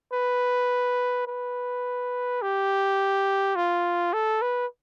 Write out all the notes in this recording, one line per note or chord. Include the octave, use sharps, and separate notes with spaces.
B4
B4
G4
F4
A4
B4